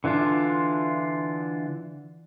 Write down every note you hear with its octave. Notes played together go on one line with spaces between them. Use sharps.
D3 E3 D4 F4